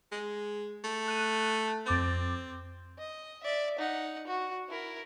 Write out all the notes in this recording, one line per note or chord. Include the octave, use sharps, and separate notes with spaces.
G#3
A3
F#6 D#7
F2 C4 D6 A6
D#5
D5 E5
D#4 F#5
F#4
E4 A#4